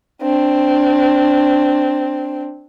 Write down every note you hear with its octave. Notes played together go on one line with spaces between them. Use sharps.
C4 D4